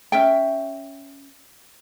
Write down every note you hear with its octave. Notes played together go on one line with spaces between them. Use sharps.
C#4 E5 G5